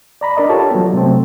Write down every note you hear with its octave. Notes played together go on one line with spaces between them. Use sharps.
D5 A#5 B5
D4 A#4 D5 D#5
F4 G4 A4 C#5 A5
F#3 B3
C3 F#3 A3 C4